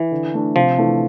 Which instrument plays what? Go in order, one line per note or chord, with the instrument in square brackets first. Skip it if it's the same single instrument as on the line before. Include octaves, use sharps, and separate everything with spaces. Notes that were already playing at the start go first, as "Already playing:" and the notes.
Already playing: [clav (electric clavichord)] E3
[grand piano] D3
A3 D4
[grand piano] C3 [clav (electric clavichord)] F3
[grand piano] E3 A3 D4